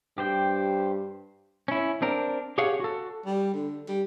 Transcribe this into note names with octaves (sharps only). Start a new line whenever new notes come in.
G2 G4 C5 G5
C#4 E4
C4 D4 A#4
G4 G#4 C#5 F5 F#5
F#4 A4
G3
D3
G3